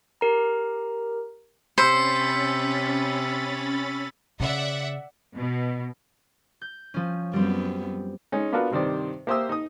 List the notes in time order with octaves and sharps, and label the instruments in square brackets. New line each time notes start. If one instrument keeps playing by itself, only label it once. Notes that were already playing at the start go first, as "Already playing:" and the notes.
[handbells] G4 A#4 A#5
[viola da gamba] C3 [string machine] C#4 B5 A6 [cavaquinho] C5 [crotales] E6 B6 C#7
[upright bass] C#3 [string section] D5 E5 F#5
[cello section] B2
[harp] G6
F3 C#4
[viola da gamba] F#2 B3 [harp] G3 C4
[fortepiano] G#3 C#4 D#4
B3 D4 F4 F#4 A#4 B4
G2 C3 D#3 C5 D5
A#3 G4 C5 E5 D#6 E6
D#4 D#6